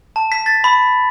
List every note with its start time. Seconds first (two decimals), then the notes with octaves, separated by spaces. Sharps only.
0.16 A5
0.32 B6
0.46 A6
0.64 B5